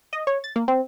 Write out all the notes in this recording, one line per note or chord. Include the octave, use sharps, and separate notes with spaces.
D#5
C#5
A6
A#3
C4